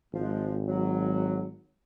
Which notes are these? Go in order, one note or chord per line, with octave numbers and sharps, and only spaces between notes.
G#1 F3 G#3
F#3